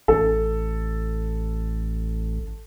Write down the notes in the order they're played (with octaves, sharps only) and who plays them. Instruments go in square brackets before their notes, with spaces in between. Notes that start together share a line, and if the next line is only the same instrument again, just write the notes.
[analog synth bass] A1 [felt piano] A4